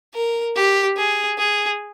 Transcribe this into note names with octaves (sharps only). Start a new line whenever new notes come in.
A#4
G4
G#4
G#4